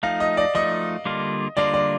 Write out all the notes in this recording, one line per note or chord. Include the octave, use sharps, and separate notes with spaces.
F3 A3 D#4 F5
D#5
D5
F3 A3 D#4 D#5
D3 G3 A#3 D4 F4
D3 G3 A#3 D4 F4 D5
D5